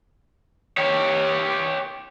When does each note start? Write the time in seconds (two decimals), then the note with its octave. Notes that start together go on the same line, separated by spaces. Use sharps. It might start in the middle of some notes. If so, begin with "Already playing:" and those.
0.77 G4 C#5